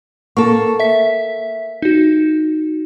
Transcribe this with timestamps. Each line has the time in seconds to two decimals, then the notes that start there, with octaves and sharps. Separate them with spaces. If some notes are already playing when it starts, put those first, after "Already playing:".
0.37 A#3 A4 C#6
0.80 E5 B6
1.82 D#4 F#4